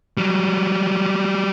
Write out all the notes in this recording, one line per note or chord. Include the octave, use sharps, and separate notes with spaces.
F#3 G3